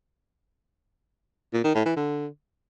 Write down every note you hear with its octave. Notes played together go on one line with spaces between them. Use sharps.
A#2
D#3
A2
E3
D3